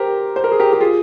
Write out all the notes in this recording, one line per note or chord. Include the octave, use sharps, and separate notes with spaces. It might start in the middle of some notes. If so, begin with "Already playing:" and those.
Already playing: G4 A#4 C5
C5
A#4
G#4
G4 A#4
G4
F4 G#4